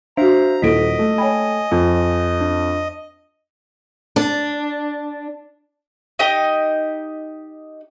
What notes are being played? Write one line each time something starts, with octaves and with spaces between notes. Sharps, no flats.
D4 F#4 C5 E5 F5 A#5
D#1 A#3 E4 A4 D#5 B6 D7
A3
C#5 G5 G#5 B5
F2
D4
D4
D#4 G4 D#5